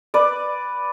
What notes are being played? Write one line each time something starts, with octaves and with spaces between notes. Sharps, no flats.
B4 D5